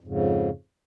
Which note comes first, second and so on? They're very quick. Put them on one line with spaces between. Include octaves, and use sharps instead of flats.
F2 G#2 C#3